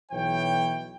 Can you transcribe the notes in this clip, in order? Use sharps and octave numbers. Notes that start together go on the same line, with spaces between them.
B1 E3 C#5 G5